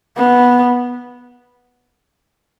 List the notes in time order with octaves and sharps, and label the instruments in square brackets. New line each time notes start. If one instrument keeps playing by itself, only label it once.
[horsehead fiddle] B3